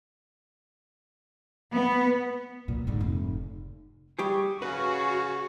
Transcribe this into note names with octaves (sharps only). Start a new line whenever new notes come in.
B3
A#2 F#3
G#2 D3
F1
G3 G4 G#4 C#6
C#3 F#4 B4 F5 G#5